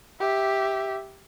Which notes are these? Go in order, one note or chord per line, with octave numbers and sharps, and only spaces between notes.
G4 E5